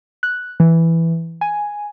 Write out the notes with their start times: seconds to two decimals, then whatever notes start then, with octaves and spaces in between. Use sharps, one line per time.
0.23 F#6
0.60 E3
1.41 G#5